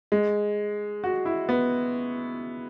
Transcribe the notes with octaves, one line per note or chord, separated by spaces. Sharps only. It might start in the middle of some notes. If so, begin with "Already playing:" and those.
G#3
F#4
E4
B3